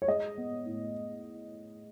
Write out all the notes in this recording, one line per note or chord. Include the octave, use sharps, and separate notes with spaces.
C#5
G#3 D#5
B3
A2